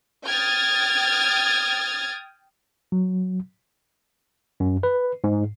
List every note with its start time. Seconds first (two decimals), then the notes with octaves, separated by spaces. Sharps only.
0.25 G5 D#6 F6 G#6 A6
2.92 F#3
4.60 F#2
4.83 B4
5.24 G#2